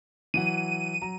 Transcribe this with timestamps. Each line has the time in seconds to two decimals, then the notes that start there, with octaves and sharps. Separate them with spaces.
0.34 E3 F#3 F#5 D#7
1.02 F#3 A#5